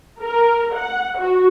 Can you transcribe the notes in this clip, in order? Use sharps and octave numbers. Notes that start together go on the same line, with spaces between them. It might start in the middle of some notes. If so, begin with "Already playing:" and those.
A#4
F#5
F#4